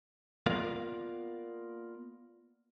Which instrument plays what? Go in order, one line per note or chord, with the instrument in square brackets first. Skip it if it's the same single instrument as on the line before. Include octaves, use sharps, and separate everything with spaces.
[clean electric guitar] A#3 B3 F4 A#4 D5 F5